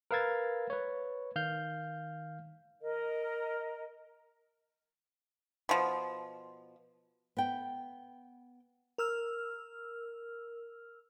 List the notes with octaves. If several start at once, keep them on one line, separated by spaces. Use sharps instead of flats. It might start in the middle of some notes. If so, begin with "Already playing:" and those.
A#4 B4 F5 E6 G#6 A6
B4 C#5
D#3 F5 F6 G6
A#4 D#5
B2 F3
B3 G5
A#4 E6 F6